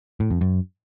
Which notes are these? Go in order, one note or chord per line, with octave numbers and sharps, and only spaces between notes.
A2
F2
F#2